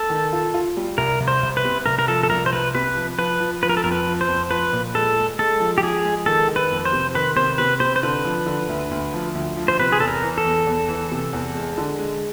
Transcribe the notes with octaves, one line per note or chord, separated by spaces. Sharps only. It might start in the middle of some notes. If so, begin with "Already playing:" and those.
Already playing: A4
D#3
F4
F4
G3
C2 A#4
C2
C5
C2
B4
C3
C2 A#4
A#4
F3 A4
A4
C2 A#4
C5
C2 B4
C3 B4
F3
F3 B4
F3
F3 B4
A#4
A4
F2 A#4
B4
F3
C5
F2
F3 B4
A#2
G#3 A4
G#3
G#3 A4
F3
G4
F3 G#4
G#3
D#3 A4
D#3
B4
F2
C5
C3
D#3 B4
C3 C5
C3 B4
C3 C5
C5
D3 B4
F3
D3
D2
D2
F3
D2
F3
C5
C3 B4
G#4
E2 A4
A#4
E3
A4
E2
E2
E3
C3
E2
G#3
D3
G#3